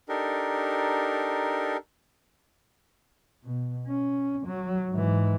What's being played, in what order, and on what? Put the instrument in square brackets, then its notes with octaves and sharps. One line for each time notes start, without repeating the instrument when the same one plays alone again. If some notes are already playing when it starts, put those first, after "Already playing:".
[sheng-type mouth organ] D4 D#4 G4 A4 A#4
[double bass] B2
C#4
F#3
G#2 E3